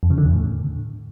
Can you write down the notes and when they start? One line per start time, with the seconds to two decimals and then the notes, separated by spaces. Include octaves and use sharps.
0.03 F2
0.10 C#3
0.18 D3
0.25 E2
0.33 A2